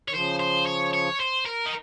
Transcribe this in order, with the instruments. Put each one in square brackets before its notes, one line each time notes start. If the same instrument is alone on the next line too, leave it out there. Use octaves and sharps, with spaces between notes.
[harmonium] D#3 [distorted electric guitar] C#5
[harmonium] C#3 F3 [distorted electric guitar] C5
[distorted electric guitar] C5
C#5
C#5
C5
A#4
D#4